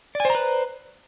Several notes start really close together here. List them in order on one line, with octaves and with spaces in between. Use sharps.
D5 G#5 C5 A#5 B4